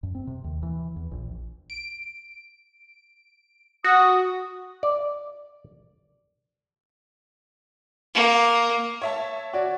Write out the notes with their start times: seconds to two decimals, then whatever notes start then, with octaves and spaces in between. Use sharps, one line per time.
0.03 F#2
0.15 C4
0.27 C3
0.44 D#2
0.63 E3
0.96 E2
1.11 A#1
1.70 D7
3.84 F#4 D#6
4.83 D5
8.14 A#3
9.02 C#5 E5 A5
9.53 F#4 D5